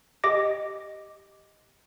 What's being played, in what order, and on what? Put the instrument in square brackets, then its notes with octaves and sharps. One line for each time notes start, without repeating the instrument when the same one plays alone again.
[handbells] G4 D#5 D6 A#6